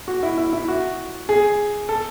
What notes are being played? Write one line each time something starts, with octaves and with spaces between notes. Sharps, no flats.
F#4
E4
E4
E4
F#4
G#4
A4